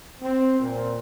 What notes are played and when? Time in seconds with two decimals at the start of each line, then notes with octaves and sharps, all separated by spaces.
0.21 C4
0.60 A#2